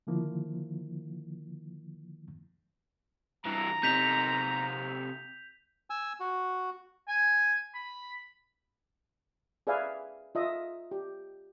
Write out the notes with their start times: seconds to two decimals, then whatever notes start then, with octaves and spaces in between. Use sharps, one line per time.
0.07 D3 D#3 F3 A#3 E4
3.45 G2 E3 A#5
3.83 C3 D#4 G6 B6 F7
5.90 G#5 E6
6.20 F#4
7.08 G#5
7.74 B5
9.67 G#4 B4 D5 E5 F5 G#5
10.35 F4 D#5 E5
10.91 G4